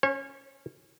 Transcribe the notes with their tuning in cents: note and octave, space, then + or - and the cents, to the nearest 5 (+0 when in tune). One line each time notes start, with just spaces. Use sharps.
C#4 +0 C#5 -35